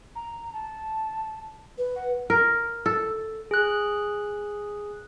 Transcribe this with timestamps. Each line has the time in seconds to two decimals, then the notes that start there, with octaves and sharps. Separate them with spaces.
0.16 A#5
0.53 A5
1.78 B4
1.96 F#5
2.30 A#4
2.86 A4
3.51 G#4 F#6